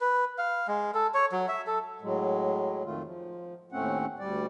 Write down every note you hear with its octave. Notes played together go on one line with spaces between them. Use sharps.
B4
F5
G#3
A4
C#5
F#3
E5
A4
A2 F#3 G#3
F2 D#3 A3 F4
F3
D#2 A2 A3 C4 C#4 F#5
D2 G3 D5